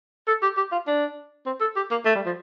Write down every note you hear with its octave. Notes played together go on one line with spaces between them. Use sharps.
A4
G4
G4
F4
D4
C4
A4
G4
A#3
A3
G3
F3